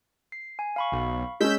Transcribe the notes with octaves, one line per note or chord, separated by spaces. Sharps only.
C7
G#5
F5 B5 C#6
B1
G#3 C#4 E6 G6 B6